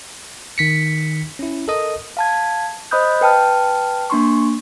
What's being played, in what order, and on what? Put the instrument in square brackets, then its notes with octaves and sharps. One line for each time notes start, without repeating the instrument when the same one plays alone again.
[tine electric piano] D#3 B6 C#7
C#4 E4
A4 A#4 D#5 D#6
[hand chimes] F5 A5 G#6
C5 D#5 B5 D#6 F#6 G6
B4 G5 A5 F6
A#3 D4 C6 C#6